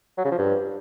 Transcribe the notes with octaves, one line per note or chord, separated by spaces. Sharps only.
F#3
C#3
F3
G2